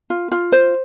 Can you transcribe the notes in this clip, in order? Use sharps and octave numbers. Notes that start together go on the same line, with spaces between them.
F4
F4
C5